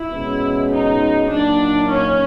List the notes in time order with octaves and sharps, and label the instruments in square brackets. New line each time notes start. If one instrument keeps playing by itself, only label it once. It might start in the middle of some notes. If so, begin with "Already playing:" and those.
Already playing: [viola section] E4
[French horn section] B2 G#3 C#4
[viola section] D#4
[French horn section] A#2 F#3 A#3 D#4 [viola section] D4
[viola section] C#4